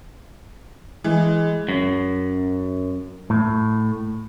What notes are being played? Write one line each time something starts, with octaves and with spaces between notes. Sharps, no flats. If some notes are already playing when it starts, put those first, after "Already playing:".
E3 G#3
F#2
A2